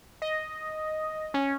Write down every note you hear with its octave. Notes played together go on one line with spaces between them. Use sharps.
D#5
C#4